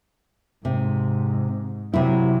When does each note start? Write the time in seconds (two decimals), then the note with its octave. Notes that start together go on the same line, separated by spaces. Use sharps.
0.65 G#2 C3
1.94 C3 F#3 E4